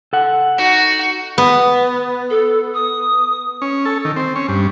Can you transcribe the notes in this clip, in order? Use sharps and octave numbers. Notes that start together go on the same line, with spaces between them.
A4 F#5
D#4 F#4
B3
A4
D#6
C#4
A4
D#3
C4
C#4
G2